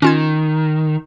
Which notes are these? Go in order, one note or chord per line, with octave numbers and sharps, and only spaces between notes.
D#3 C#4 F4 G#6